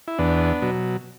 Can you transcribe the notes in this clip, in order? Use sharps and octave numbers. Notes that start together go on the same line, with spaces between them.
E4
E2 B3 D4
B2 F#3